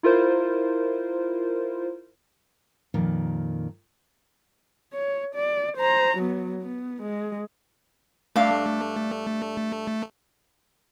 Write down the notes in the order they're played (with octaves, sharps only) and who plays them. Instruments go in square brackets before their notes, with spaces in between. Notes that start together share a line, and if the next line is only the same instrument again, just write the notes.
[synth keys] E4 F4 A#4 C5
[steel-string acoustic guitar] F2 A#2 D#3
[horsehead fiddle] C#5
D5
C5 A#5
F#3 B3
B3
G#3
[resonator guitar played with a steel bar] G2 D4 F5 [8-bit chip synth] A3